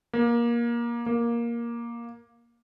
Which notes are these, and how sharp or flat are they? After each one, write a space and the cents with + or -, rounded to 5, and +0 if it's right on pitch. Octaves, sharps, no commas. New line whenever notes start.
A#3 +20
A#3 +10